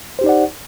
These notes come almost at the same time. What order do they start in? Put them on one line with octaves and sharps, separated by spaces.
C5 G4 D#4 D5 F#5